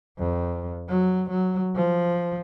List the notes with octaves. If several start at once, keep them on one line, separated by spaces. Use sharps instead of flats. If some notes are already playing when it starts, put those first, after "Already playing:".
F2
F#3
F#3
F3